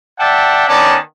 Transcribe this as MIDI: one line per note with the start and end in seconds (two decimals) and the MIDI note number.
0.19 0.65 74
0.19 0.65 76
0.19 0.65 78
0.19 0.65 79
0.19 0.65 81
0.69 0.96 51
0.69 0.96 59
0.69 0.96 61
0.69 0.96 74
0.69 0.96 81